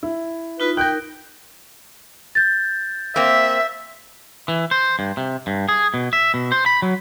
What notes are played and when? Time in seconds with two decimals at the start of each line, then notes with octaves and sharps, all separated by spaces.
0.03 E4
0.60 D#4 F4 B4
0.77 D#4 A#4 G5 F#6 G6
2.35 G6 A6
3.16 A#3 C4 E5
4.48 E3
4.71 C5
4.99 G2
5.17 C3
5.47 G2
5.69 G#4
5.94 B2
6.13 E5
6.34 B2
6.52 C5
6.66 B5
6.82 F#3